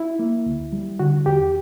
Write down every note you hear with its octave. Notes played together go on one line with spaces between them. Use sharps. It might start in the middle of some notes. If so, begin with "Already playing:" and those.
Already playing: E4
A#3
D2
G3
D3 F#4
E2 G4